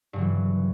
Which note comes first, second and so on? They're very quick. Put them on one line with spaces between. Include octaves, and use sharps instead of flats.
G2 C#3 F#3 E3